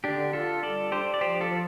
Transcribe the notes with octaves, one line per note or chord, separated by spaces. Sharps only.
D3 D4 G4
D3 F4 A4
G3 A4 D5
D4 G4 C5
D5
F3 G4 C5
F4 A4
F3